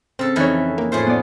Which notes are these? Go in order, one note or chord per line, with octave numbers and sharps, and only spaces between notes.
C#3 C4 A4
F2 E3 D#4 C#5
A#3
A2 A3 F4 G#4 C5
B3 D5